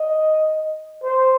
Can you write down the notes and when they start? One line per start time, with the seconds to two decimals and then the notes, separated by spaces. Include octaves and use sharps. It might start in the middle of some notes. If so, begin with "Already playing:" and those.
Already playing: D#5
1.03 C5